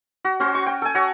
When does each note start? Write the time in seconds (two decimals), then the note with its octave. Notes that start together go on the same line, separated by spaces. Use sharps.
0.25 F#4
0.40 C#4 F#4 C5
0.55 C#6
0.66 G5
0.82 A4 G#5
0.95 F#4 C#5 C#6